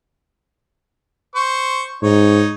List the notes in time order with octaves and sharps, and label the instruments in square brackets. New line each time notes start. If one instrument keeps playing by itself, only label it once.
[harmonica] C5 C#6
[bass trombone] G#2 [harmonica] D#4 C#5